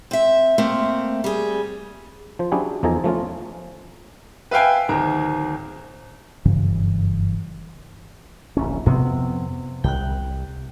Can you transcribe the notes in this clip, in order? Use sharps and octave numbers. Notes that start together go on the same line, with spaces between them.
C4 E5
A3 A#3 C4
G3 G#4
F3 C5
F#3 C#4 D4 E4 G4 G#4
E2 F3 D#4 A4 G#5 A#5
F3 A3 C#4 F4
B4 E5 F5 G5 G#5
D1 D#3 A#5
F#1 G2 C#3 E3
D1 A#1 C#4
F2 C3 B3 C4
C2 G5 F#6